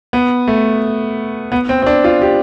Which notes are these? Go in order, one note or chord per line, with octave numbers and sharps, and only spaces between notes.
B3
A3
B3
C4
C4
D4
F4
G4